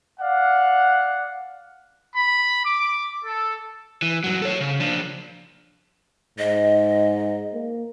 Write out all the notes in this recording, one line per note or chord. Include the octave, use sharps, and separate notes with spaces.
D5 F5 F#5
B5
D6
A4
E3
G2 F#3
A4 C#5
C#3
F3 D4
G#2 D#5
A#3